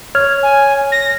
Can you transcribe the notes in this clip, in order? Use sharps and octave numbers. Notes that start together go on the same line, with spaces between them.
C#5 F6 G#6
G#5
A#6